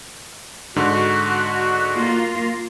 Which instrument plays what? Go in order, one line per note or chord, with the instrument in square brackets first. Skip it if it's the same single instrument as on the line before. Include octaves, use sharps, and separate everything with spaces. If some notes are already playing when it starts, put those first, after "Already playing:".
[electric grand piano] G#2 D3 [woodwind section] F#4
[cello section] A#3 F4